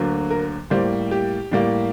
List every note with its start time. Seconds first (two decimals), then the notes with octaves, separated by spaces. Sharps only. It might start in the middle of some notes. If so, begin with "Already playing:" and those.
Already playing: D2 D3 F#3 A#3
0.31 A#4
0.70 A2 G3 A#3 C5
1.11 G4
1.51 A2 G3 A#3